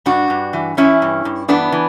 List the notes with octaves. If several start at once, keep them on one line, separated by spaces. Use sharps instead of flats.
G2 D4 F#4
G2
E3
E3 C#4 E4
G2
G2
E3 B3 D4
E3